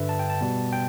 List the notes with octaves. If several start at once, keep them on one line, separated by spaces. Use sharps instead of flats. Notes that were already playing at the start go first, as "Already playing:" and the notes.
Already playing: G2 D3 G3 B4 E5
A5
G5
A5
B2 G3 B3
G5